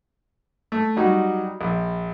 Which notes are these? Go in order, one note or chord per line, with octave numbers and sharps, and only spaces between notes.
A3
F#3 G3 D#4 F#4
A#1